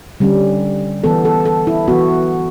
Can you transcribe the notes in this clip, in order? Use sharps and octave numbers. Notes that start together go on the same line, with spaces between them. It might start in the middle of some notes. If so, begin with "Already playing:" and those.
D3 G3 C#4
E3 B3 A4
A4
A4
E4
E3 B3 F#4